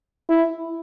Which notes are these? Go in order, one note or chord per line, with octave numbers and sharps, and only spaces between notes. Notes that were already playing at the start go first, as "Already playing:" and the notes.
E4